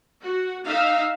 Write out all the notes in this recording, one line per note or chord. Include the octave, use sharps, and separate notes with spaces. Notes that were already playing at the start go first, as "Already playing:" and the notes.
F#4
D#4 E5 F5